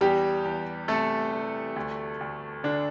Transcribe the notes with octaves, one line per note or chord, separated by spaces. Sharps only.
E2 G3 G4
E2
C3 A3 A4
G3
D2
D2
D3 D4